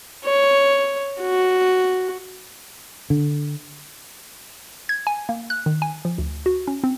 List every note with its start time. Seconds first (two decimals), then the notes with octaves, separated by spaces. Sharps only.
0.24 C#5
1.20 F#4
3.10 D3
4.89 G#6
5.07 G#5
5.29 A#3
5.50 F#6
5.66 D#3
5.82 G#5
6.05 F3
6.18 D2
6.46 F#4
6.67 C#4
6.84 C4